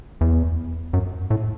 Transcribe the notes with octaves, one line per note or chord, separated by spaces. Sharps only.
E2
F#2
A2